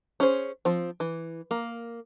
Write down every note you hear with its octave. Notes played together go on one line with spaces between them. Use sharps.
C#4 G#4 C5
F3 C4
E3
A#3